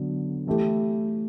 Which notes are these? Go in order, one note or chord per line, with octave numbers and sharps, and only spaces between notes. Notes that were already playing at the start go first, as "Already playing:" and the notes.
Already playing: D3 F#3 B3 D4
E3 A3 E4 G4